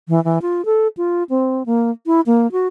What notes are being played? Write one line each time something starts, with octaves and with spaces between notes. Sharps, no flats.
E3
E3
F4
A4
F4
C4
A#3
E4
A#3
F#4